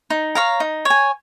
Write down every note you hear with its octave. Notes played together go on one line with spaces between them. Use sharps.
D#4
C#5 F5 A#5
D#4
C#5
G#5